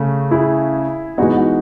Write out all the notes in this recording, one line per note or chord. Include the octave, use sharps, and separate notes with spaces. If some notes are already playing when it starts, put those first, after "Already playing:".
Already playing: C#3 A3
E4 G#4
E3 G#3 B3 D#4 F#4
F#4